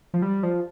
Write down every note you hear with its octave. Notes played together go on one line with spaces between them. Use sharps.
F3
G3
F3